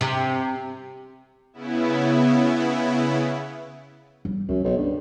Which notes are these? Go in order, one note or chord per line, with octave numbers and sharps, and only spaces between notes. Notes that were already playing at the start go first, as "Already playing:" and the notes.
C3
C#3 B3 E4
G3
C#2 F#2
B1
G2